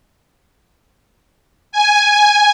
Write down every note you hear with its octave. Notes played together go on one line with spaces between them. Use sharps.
G#5